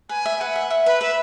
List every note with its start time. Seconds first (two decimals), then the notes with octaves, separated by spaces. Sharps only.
0.09 B4 G#5
0.26 E5
0.41 B4 F#5
0.56 E5
0.71 E5
0.86 B4 B5
1.01 B4 E5